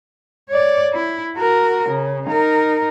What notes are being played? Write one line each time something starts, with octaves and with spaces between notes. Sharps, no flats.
C#5 D5
E4
F#4 A#4
C#3
D#4 A#4